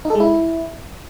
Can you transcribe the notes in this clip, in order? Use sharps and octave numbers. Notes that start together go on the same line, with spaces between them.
D#4
A4
G#3
E4